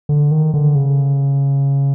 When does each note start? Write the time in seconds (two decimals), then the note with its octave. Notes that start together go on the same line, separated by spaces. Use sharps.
0.09 D3
0.31 D#3
0.54 D3
0.75 C#3